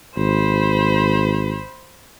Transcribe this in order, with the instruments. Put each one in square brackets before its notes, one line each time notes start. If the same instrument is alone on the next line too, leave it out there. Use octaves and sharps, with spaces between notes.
[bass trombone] G#1 [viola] C5 B5